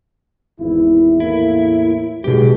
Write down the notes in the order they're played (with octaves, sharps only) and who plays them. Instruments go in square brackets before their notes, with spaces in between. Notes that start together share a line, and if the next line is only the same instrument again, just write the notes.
[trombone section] G#1 E2 E4
[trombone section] E2 A2 A#3 [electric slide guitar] E4
[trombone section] B1 G2 G#3 [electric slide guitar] B2 G4